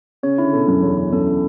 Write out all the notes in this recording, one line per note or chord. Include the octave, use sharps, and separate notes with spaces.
C#3 C#5
D3 E4
B2 A4
F#2 E4
E2 C#5
E4
F#2 A4
E4